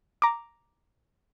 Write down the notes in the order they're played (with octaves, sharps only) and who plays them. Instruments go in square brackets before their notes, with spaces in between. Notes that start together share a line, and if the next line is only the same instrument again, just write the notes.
[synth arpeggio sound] A#5 D6